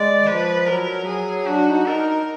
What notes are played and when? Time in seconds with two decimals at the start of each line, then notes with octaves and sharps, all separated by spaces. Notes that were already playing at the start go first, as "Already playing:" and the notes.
Already playing: G#3 D5
0.22 D#3
0.27 F3 B4
0.66 F#3 A#4
1.06 F#3 G#4
1.46 D4 F#4
1.66 D#4
1.86 D#4 A#4